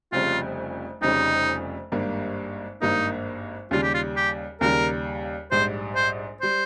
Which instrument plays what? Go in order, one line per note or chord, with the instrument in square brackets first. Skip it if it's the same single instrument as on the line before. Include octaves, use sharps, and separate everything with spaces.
[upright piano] F1 F2 C#3 G3 C#4 [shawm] F4
[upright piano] F1 F2 C#3 G3 C#4 [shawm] D#4
[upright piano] G#1 G2 G3 A#3
[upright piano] G#1 G2 G3 A#3 [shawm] D#4
[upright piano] D#2 C#3 G3 [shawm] F4
[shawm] G4
F4
G4
[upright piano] D#2 C#3 G3 [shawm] A#4
[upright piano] A#1 G#2 G3 [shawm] C5
[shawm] C5
[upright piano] G3 [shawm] C5